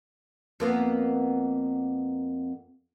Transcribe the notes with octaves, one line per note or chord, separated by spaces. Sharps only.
F2 A#3 B3